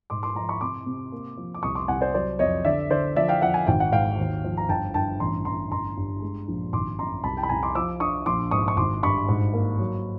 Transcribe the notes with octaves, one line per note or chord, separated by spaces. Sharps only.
G#2 C6 D6
C6 D6
F3 A#5 C6
B5 C#6
C3 C6 D6
C3
A#3
F3
D6
C2 C#6 D#6
C6 D6
C2 F#5 G#5
C5 D5
F#3 C5 D5
F2 C#5 D#5
D3 D5 E5
D3 C5 D5
F3 D5 E5
F5 G5
F3 E5 F#5
G#5
G#1 G5
F#5
G#2 F5 G5
D#2
F3
A#5
G1 G5 A5
G1 G5 A5
A1 A#5 C6
A1 A#5 C6
G1 A#5 C6
G2
G#3
A#1
G#1 C6 D6
F#2 A#5 C6
C2 A5 B5
G5 A5
B5
C2 G#5 A#5
C6 D6
F3 D6 E6
D4 C#6 D#6
A#1 C6 D6
G#2 C#6 D#6
C#6
G#1 C6 D6
G2 B5 C#6
G#2
A#3
F#3